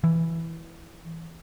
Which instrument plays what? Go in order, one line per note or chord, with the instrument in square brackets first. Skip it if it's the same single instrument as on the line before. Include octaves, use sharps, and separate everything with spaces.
[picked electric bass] E3